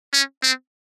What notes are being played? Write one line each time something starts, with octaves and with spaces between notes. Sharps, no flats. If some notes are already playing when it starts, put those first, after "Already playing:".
C#4
C4